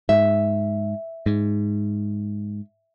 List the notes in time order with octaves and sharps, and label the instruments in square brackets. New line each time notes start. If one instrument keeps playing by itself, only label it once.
[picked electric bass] G#2 [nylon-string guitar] E5
[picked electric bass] G#2